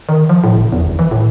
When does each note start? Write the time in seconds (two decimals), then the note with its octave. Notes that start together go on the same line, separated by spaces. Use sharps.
0.09 D#3
0.29 F3
0.44 A2
0.55 F#1
0.72 E2
0.85 G1
0.99 E3
1.11 A2